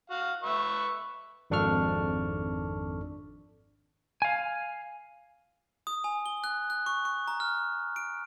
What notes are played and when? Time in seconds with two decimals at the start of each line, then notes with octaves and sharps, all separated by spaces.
0.10 F#4 F5
0.43 B4 E5 C#6
1.50 G#1 F2 D4 A4 C#6 F6
4.22 F5 G#5
5.87 D#6
6.04 G#5
6.26 G7
6.44 F#6
6.70 F#6
6.86 C#6
7.05 C#6
7.28 A#5
7.40 F6
7.96 D7